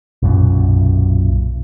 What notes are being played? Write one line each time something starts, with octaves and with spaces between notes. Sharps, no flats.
B1 F#2 A#2